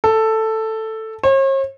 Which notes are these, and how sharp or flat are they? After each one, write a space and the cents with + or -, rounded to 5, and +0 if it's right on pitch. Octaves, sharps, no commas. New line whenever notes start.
A4 +5
C#5 -45